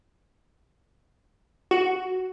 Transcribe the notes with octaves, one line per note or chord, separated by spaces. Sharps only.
F#4